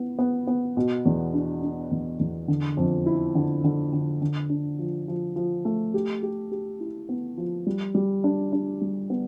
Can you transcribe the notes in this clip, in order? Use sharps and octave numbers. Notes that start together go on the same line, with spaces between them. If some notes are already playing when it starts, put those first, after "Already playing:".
Already playing: B3 E4
B3
B3
B2
E2
D4
D4
E2
E2
D3
F2
E4
D3
D3
D3
D3
D4
F3
F3
F3
A3
G4
G4
G4
E4
B3
F3
G3
G3
D4
D4
G3
B3